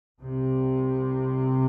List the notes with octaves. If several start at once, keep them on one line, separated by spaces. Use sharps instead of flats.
C2 C3